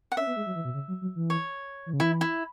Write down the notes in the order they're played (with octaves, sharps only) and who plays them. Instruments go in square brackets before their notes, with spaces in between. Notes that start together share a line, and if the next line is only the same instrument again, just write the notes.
[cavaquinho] F#5
[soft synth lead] C#4 [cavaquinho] E5
[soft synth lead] B3
G#3
F#3
E3
B2
C#3
F#3
F#3
E3
[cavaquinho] C#5
[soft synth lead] E3
C#3
[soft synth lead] E3 [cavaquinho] E4
[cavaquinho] E4